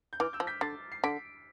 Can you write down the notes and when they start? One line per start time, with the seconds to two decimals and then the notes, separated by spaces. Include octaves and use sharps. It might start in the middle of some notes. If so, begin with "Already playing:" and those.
0.13 G6
0.20 E3 D6 F6
0.33 E6 G6
0.40 F3
0.47 G6 B6
0.61 D3 A6 C7
0.92 C7
1.04 D3 B6 D7